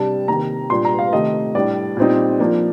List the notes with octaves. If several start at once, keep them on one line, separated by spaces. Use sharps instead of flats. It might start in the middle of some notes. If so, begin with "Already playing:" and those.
Already playing: C3 G3 D4 A5
C3 D#3 A#3 A#5
A#2 G3 D4 C6
A#5
F5
C3 D#3 A3 D#5
A2 G3 D4 D5
A#2 G3 C4 D#4
F3 A#3 D4